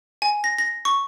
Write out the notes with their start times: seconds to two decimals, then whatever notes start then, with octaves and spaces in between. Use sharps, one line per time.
0.22 G#5
0.44 A#6
0.58 A#6
0.85 C#6